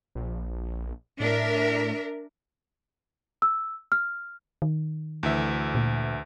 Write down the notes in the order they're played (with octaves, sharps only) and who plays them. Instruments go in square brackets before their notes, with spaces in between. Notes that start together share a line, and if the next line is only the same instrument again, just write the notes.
[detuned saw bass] A#1
[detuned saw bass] A2 [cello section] D4 A#4 E5
[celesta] E6
F6
[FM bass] D#3
[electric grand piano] D2 E3 E5
[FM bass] A#2